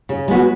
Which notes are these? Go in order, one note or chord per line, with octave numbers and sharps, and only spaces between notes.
C#3
G#3 B3 F#4